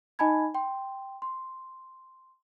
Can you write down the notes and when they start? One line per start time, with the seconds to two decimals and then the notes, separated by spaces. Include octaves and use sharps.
0.19 D#4 D#5 G#5 A5 B5 G#6
0.55 G5 C6
1.22 C6